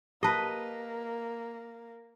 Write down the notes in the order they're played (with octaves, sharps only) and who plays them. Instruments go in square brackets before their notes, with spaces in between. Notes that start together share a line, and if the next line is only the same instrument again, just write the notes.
[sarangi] A#3 [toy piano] G4 A5 [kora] B4 D#5